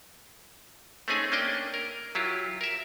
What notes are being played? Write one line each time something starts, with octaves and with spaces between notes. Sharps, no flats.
A3 C4 C#4 D#4 G#4 G#5
A#3 C#4 D4 D#5 G5
A#4
F#3 E4 F4 G4
A#4 E5